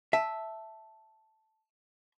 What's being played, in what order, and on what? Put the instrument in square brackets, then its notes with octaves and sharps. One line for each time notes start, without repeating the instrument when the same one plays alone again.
[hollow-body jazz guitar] E5 [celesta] A5